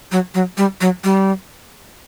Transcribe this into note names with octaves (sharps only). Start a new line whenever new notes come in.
F#3
F#3
G3
F#3
G3